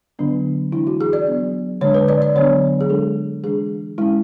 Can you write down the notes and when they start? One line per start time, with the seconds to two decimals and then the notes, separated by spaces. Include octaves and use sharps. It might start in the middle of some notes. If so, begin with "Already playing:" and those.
0.19 D3 F#3 B3 D4
0.72 E3 G#3 D4 E4
0.87 F#4
1.01 G#4
1.13 D5
1.27 F#3 B3 D4
1.81 D3 G#3 D4 C#5
1.94 B4
2.08 D5
2.22 D5
2.35 D3 F#3 B3 D4 C#5
2.81 G#4
2.89 D3 G#3 D4 A4
3.44 E3 G#3 D4 G#4
3.98 G#3 C#4 E4